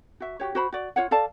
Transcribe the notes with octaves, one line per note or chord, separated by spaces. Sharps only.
F#4 E5
F#4 G4 C#5
F#4 C5 B5
F#4 D5
F4 C#5 F#5
A4 D5 F5 A5